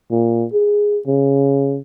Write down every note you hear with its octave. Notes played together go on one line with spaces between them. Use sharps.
A#2
G#4
C#3